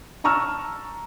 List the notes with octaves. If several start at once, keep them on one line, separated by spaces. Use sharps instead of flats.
A5 A#5 C#6 E6 F6